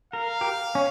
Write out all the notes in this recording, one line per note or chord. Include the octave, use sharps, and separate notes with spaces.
A#4 F5
G4 A#4
C#4